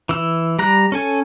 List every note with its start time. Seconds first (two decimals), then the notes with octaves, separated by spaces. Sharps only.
0.09 E3 E6
0.59 G3 A#5 F#6
0.92 C#4 A4 G#5